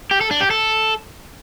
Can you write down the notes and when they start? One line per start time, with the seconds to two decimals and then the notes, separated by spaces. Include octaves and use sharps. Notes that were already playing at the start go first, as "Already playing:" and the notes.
0.11 G4
0.21 A4
0.31 D4
0.41 G4
0.50 A4